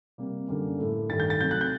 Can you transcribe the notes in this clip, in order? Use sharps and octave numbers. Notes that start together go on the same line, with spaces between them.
C3 G3 A#3
F#2 D3 G3 A#3
A2 A3
G2 D#3 A3 A6
G6
A6
C3 F#3 A3 G6
F#6
G6